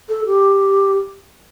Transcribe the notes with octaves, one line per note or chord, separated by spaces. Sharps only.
A4
G4